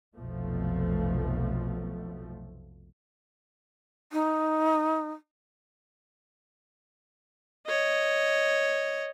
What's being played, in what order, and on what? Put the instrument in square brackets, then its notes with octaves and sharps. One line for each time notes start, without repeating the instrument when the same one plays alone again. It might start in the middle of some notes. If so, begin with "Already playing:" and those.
[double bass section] F1 B1 B2 F3 A3
[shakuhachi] D#4
[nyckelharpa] C#5 D#5